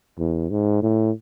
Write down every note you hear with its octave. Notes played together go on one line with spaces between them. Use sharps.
E2
G#2
A2